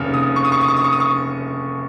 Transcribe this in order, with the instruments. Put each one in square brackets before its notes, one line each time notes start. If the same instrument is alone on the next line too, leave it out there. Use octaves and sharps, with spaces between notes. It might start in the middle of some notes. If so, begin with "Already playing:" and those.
Already playing: [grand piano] F1 D#2 C#3 F6
D#6
C#6
D#6
C#6
D#6
C#6
D#6
C#6
D#6
C#6